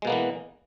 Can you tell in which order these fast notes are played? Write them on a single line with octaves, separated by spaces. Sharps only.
G#3 B2 A#3 B3 E3